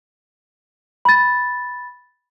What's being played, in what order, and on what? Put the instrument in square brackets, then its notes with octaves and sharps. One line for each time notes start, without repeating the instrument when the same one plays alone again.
[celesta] B5 A6